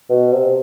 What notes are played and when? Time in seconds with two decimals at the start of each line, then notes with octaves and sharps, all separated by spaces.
0.09 B2
0.32 C3